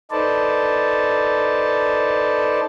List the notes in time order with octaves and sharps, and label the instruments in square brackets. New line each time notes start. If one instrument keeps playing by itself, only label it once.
[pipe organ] D#4 A4 B4 C5 D5 A5